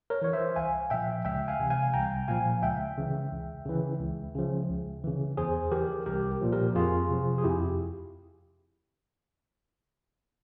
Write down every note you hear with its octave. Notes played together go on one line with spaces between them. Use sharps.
A#4 C#5
E3 C#5
C5 E5
C2 F5 G#5
A#2 F3 E5 G5
C#2 E5 G5
F5 G#5
C3 E3
F5 G#5
C2 G5 A#5
A#2 F3 F5 G#5
C#2 E5 G5
C#3 E3
C#2
C#3 E3
C#2
C#3 F3
C#2
C#3 E3
E2 G#4 C5
E3 G4 A#4
C2 G4 A#4
A#2 F3
G4 A#4
F2 F4 G#4
C3 F3
G#4
F2 E4 G4